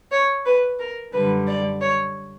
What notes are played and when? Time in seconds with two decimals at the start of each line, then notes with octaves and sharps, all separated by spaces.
0.11 C#5
0.45 B4
0.79 A#4
1.13 F#2 D3 G3 B4
1.47 D5
1.81 C#5